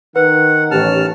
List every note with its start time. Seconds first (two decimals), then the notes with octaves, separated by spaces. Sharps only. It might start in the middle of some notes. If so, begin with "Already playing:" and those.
0.16 D#3 B4 F#5
0.71 A1 C#4 G4 A5 F6